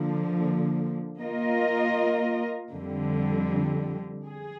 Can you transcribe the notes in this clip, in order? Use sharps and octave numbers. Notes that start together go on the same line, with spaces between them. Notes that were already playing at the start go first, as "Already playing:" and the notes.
Already playing: D3 F3 A#3
A#3 F4 A#4 D#5
F2 D3 G3
G#4